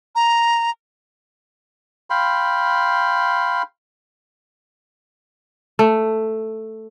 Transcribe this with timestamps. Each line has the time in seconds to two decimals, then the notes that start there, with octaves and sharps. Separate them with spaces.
0.15 A#5
2.10 F5 G5 B5 C6
5.79 A3